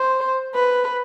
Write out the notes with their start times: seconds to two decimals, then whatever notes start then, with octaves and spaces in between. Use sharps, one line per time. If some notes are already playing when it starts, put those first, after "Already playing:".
Already playing: C5
0.55 B4